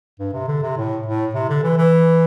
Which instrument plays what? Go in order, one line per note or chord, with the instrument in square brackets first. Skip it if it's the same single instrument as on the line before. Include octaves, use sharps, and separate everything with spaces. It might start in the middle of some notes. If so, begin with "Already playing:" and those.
[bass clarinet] G2
C3
D3
C3
A2
A2
C3
D3
E3
E3